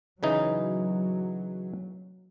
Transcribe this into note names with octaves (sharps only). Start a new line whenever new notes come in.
C#3 E3 F#3 D#4